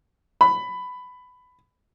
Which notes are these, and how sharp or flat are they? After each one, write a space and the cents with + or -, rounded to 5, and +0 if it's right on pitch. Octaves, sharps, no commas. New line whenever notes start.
B5 +15